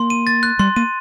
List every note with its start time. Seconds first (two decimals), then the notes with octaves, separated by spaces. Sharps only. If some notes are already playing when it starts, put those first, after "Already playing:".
Already playing: A#3 C6
0.10 D#7
0.27 A6
0.43 F#6
0.59 G3 C6
0.76 A#3 D#7